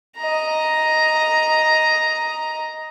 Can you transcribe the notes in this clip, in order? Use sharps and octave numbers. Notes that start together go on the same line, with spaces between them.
D#5 A#5